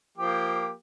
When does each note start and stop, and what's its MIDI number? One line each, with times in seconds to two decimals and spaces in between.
0.18 0.72 53
0.18 0.72 58
0.18 0.72 67